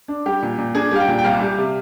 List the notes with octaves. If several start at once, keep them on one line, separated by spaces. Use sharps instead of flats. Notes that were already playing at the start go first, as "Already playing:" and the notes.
D4
G3 G4
A#2
A#2
D4 G#4
G3 F5
G5
A#2
G5
C2 F5
G3
C3